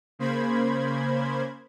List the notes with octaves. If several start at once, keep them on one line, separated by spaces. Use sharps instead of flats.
C#3 A#3 C5 B5 G#6